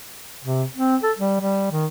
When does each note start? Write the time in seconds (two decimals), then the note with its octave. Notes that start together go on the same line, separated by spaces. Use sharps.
0.44 C3
0.76 C4
1.03 A4
1.18 G3
1.41 G3
1.72 D#3